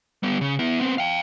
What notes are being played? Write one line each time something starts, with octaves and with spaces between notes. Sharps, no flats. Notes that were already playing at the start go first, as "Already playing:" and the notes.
G3 B3
C#3
B3 E4
B3 C4
F5 G5